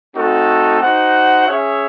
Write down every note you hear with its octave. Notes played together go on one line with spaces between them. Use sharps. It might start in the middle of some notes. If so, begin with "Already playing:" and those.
A3 C4 D#4 F#4 A4
D#4 F#4 C5 F#5
C#4 G#4 C#5 E5